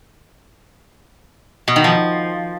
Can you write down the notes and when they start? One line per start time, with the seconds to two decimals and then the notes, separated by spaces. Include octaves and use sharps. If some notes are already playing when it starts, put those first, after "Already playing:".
1.68 B2
1.76 D#3
1.84 F3